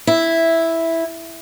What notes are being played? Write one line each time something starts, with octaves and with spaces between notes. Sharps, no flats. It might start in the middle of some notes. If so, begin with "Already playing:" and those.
E4